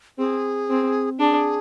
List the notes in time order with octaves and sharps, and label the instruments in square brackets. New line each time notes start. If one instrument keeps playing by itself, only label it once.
[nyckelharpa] C4 [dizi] G#4
[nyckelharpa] C4
[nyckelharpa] D4 [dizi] G#4